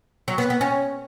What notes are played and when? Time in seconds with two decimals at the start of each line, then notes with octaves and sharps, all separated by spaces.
0.28 F#3
0.38 B3
0.50 B3
0.61 C#4